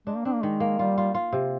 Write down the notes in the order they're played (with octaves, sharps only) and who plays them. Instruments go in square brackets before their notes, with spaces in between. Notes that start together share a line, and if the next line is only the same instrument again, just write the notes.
[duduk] G#3 [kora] D4
[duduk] A#3
[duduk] C4 [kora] D4
[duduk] A#3
[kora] D#3 [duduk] G#3
[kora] A#3
[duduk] G3 [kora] F4
[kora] F4
F4
C3